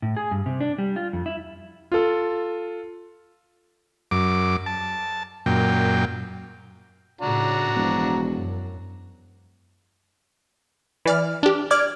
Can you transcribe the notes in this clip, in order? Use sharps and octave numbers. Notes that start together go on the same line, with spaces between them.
A2
G#4
G2
C3
D4
G3
F4
F2
E4
F4 A4
F#2 D6
A5
F#2 A#2 G5
A2 C#3 D4 F#4 A#5
E1 F3
F#2
E3 D5 F6
D4 G4
D5 D6 F6 G#6